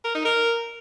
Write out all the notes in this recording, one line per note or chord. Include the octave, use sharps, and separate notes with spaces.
A#4
D#4
A#4